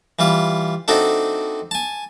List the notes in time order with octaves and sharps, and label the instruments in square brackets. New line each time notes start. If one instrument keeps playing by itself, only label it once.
[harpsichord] E3 G3 F4
A3 C4 D4 D#4 F#4 A4
G#5 A5